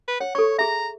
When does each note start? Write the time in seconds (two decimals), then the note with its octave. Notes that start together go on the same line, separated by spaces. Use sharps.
0.08 B4
0.20 C#5 F#5
0.35 A4 C#5 C#6
0.58 G#4 E5 A#5